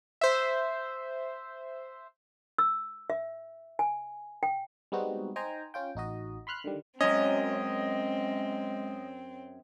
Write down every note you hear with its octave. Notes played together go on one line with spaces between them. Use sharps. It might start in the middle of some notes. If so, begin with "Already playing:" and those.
C5 E5
E6
E5
G#5
G5
G3 G#3 B3 C4 D#4 F#4
D#4 C5 G5 G#5 A#5
C#4 F4 G5
A1 D#4 F#4 D#5
B5 C6 F6 F#6
D3 D#3 G3
F#2 G#3 C4 C#4 D#5